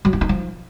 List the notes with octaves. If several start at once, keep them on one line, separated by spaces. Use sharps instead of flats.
F#3
E4
D#4
F3